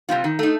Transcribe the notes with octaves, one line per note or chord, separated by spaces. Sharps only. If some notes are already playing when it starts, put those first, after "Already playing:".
C3 G3 C4 F4
D#3
A3 D#4